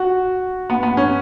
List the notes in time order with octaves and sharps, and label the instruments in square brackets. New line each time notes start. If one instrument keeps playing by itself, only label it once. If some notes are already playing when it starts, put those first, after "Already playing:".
Already playing: [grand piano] F#4
B3
B3
C#4